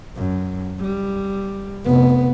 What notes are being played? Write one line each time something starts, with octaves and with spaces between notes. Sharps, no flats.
F#2
G3
F1 B3